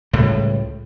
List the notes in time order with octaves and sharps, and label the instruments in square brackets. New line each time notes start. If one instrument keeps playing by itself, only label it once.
[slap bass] C#2 A2 G3